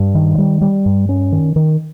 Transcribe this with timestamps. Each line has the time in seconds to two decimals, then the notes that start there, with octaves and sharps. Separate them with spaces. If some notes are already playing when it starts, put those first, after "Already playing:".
Already playing: G2
0.15 D#3
0.38 G3
0.61 G3
0.86 G2
1.09 C#4
1.32 D#3
1.56 D#3